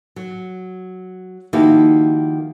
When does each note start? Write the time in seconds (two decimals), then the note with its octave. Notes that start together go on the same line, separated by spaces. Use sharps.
0.16 F#3
1.53 D#3 F3 A#3 E4 F#4 G4